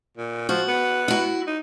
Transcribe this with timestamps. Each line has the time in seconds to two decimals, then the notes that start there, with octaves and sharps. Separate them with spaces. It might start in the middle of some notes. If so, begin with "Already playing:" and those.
0.17 A#2
0.49 F3 F#4
0.68 B3
1.08 E4 F#4
1.47 D#4